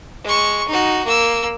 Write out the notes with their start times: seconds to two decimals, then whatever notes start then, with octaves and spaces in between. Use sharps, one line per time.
0.24 G#3 C#6
0.68 D#4 F#4
1.05 A#3 E6